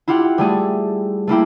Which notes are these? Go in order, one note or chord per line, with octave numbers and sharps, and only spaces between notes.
E4 F4 G4 F#5
G3 A3 G#4 A4
A3 A#3 E4 G4